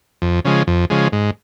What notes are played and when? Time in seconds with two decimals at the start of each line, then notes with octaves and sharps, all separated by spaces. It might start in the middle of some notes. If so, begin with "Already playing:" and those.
0.22 F2
0.45 C#3 F3 G#3
0.67 F2
0.90 C#3 F3 G#3
1.12 G#2